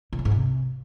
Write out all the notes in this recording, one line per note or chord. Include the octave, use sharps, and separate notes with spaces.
B2
C#3
G#2
C3